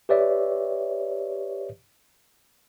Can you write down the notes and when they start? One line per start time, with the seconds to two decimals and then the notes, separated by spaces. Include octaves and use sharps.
0.09 G4 B4 C#5 D5 E5